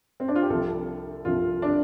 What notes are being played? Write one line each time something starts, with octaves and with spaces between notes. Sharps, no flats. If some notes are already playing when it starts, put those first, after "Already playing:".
C4
D4
F4
G4
C2 C3 F3 A4
C2 C3 F3 F4
D4